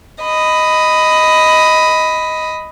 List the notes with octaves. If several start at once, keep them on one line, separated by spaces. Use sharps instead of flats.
D#5 B5